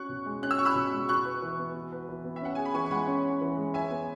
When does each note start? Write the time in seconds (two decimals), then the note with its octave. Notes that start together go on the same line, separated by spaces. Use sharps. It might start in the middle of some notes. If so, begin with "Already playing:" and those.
Already playing: C#4 F#4 C#6 F#6
0.09 B2
0.26 G#3
0.43 C#4 F#6
0.51 E6
0.59 F#4 C#6
0.65 B5 E6
0.75 B2
0.93 G#3
1.08 F#4 C#6 F#6
1.25 B4
1.42 E3
1.59 B3
1.75 F#4
1.92 B4
2.09 E3
2.25 B3
2.36 E5
2.42 C#4 F#5
2.55 G#4 G#5
2.65 B5
2.74 E3 G#5 C#6
2.86 C#6
2.91 G#3 F#5 B5
3.07 C#4
3.24 G#4
3.41 E3
3.57 G#3
3.74 C#5 E5 G#5
3.91 B3